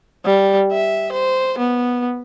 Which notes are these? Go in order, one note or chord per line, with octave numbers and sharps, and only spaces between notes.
G3
E5
C5
B3